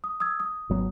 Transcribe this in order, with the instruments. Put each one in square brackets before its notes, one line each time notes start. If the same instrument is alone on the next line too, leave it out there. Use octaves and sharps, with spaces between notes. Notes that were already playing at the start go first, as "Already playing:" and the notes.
[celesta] D#6
D#6 E6 G#6
D#6
[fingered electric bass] G#1 F#3 B3